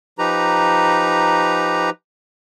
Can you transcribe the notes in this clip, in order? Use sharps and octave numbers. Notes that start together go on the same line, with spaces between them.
F3 D#4 G4 B4 A#5